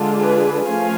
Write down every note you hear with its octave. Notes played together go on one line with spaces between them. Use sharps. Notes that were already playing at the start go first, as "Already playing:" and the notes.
Already playing: D3 G#3 D4 F4
G#4 B4
F3 A3 C#4 F5 G#5